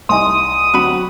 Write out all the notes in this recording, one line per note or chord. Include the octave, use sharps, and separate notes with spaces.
C2 D#4 D#5 G#5 C6 D#6
D3 F#3 C4 F#4 B5